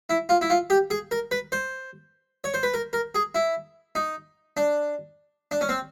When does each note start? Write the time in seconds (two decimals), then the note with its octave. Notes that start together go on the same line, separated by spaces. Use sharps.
0.10 E4
0.29 F4
0.41 E4
0.50 F4
0.70 G4
0.90 G#4
1.11 A#4
1.31 B4
1.52 C5
2.44 C#5
2.54 C5
2.63 B4
2.74 A#4
2.93 A#4
3.15 G#4
3.35 E4
3.95 D#4
4.57 D4
5.51 D4
5.61 C#4
5.69 C4